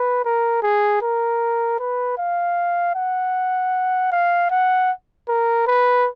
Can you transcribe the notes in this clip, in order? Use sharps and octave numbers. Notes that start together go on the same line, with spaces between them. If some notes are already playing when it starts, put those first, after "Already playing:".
Already playing: B4
A#4
G#4
A#4
B4
F5
F#5
F5
F#5
A#4
B4